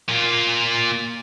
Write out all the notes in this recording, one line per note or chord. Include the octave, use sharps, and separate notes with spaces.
A#2 F4